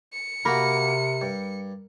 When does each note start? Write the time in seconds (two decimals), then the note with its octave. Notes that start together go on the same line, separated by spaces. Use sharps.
0.14 C#7
0.45 C3 A#3 F#4 A#4 B5
1.21 G2